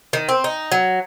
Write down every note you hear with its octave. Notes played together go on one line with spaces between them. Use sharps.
D#3
C4
D#4
F#3